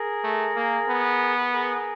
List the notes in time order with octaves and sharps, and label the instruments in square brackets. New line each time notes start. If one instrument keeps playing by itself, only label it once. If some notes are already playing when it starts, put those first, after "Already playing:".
Already playing: [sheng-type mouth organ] G#4 A#4
[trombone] A3
A#3
B3
[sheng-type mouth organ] G#4 A#4